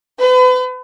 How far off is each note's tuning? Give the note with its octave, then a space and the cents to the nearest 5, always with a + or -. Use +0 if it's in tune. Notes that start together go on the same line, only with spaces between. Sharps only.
B4 +40